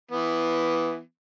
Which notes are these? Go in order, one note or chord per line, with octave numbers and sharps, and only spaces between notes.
E3 B3